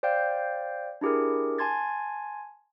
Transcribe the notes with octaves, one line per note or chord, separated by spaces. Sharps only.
C5 D5 F5 G5 G6
D4 E4 G4 G#4 A#4
G#5 A5 C6 G#6 A6